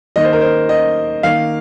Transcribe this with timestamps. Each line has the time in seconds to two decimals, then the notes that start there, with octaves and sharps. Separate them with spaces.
0.16 D#3 A#3 D#5
0.24 C5
0.33 A#4
0.41 C5
0.69 D#5
1.23 D#3 A#3 F5